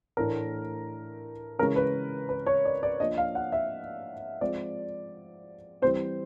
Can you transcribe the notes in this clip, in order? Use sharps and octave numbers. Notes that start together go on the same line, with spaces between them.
A2 E3 A3 D4 A#4
C#3 E3 G#3 C#4 A#4
B4
B4
C#5
D5
D5
F3 A#3 D4 D#5
F5
F#5
E5
F3 G#3 C4 D5
E3 G3 C4 C5